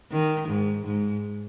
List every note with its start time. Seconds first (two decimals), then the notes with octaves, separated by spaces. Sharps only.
0.11 D#3
0.48 G#2
0.86 G#2